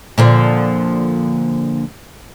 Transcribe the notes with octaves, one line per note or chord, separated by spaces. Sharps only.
A#2 D3 F3